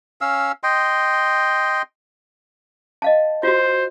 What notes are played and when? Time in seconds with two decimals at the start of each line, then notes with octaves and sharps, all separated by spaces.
0.21 C#4 F5 E6
0.63 D#5 G5 C6
3.02 D#5 F5 A5
3.43 F4 F#4 C5